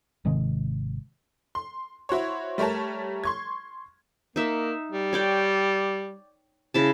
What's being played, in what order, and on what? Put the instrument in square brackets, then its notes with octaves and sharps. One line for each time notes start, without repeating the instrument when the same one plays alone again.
[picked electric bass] G#1 C3 D#3 G#3
[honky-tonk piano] C6
E4 F#4 C5 C#5
G3 A3 A#4 C#5 A5
C6 C#6 G#6
[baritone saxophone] A#3 [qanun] D#4 E5
[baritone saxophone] G3
[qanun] C#5 D5 G5
C#3 E4 A5